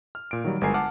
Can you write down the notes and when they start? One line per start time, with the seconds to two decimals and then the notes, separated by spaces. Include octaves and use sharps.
0.15 F6
0.31 A#2 D7
0.44 D#3 F#3 G3
0.61 G1 F#3 G#3 A#4 G#5 C7
0.74 F#5 A5 D6 F6